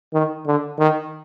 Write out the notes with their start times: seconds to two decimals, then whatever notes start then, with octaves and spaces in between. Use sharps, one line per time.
0.14 D#3
0.46 D3
0.78 D#3